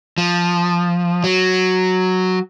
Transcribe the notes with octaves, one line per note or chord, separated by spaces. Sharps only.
F3
F#3